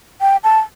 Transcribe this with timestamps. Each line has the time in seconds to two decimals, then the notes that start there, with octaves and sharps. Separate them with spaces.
0.21 G5
0.44 A5